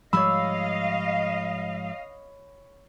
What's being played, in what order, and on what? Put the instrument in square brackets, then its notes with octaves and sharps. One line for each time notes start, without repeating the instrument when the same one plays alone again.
[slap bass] G#2 F3 G3 [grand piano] C#5 B5 [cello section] D#5 F5 [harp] E6